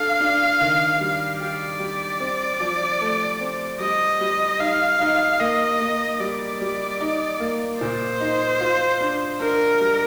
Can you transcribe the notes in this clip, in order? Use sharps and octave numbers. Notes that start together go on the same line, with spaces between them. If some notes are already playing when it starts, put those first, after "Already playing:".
Already playing: D4 A4 F5
D4
D#3
G3
G4 D5
G3
C4
F3
A3
C4
G3 D#5
G3
D#4 F5
D#4
A#3 D#5
A#3
G3 D5
G3
D#4
A#3
A#2 C5
D#4
F4
D4
D4 A#4
G3